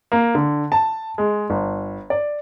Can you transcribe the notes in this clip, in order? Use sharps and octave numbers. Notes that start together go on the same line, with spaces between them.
A#3
D3
A5
G#3
G1
D5